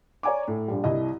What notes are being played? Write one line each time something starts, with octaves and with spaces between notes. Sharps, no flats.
C#5 D5 G#5 A#5 D6
A2
A#1 G3
C2 E4 D#5